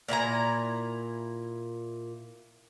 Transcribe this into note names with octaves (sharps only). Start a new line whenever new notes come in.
A#2 E4 G#5 A#5